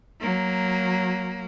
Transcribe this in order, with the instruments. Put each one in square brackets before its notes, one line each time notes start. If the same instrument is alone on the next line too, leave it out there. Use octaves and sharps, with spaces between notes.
[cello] F#3 A#3